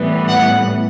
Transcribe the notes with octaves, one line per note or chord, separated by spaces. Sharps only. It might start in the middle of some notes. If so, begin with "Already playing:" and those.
Already playing: A2 E3 G3 B3
F#5